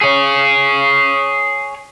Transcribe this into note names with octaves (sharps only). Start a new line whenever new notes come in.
G#4 C#5